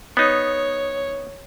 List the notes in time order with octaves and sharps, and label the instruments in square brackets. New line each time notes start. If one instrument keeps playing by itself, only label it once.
[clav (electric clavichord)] B3 D#4 [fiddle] C#5